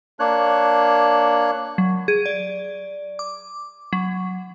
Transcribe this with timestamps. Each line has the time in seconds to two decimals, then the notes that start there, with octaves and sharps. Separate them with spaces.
0.20 A#3 D4 C#5 F#6
1.78 F#3
2.08 G#4
2.26 D5
3.19 D6
3.93 F#3